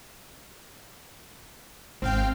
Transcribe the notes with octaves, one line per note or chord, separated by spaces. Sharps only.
G#1 C4 F5 G5